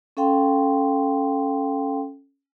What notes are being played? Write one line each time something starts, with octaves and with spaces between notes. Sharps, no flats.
C#4 A4 F5 G5 C6